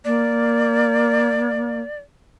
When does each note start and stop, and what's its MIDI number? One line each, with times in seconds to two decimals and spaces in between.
0.05 1.79 58
0.05 1.99 74